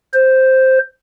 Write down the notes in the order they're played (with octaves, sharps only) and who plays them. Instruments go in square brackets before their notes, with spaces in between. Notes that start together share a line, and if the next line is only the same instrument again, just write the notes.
[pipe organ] C5